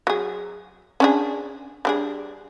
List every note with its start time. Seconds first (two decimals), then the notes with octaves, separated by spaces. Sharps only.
0.07 F#3 G#4
1.00 C#4 D4 G#4
1.85 G3 D4 G#4